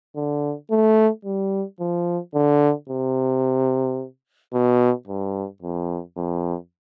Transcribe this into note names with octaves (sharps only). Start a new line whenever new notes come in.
D3
A3
G3
F3
D3
C3
B2
G2
F2
F2